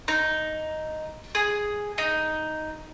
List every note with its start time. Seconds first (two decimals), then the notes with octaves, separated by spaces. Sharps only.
0.08 D#4
1.35 G#4
1.98 D#4